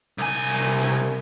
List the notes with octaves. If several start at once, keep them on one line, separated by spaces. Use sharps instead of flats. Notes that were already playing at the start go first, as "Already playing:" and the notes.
C2 G#5